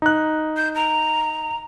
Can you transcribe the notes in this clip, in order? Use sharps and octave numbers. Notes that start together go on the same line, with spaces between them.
D#4 F#6
G6
A#5